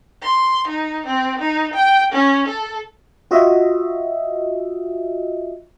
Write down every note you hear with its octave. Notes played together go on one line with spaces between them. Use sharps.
C6
D#4
C4
D#4
G5
C#4
A4
F4 F#4 D#5 E5